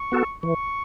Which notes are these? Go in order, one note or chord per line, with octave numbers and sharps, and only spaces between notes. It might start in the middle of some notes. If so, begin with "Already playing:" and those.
Already playing: C#6
B3 F#4 A4
E3 C#6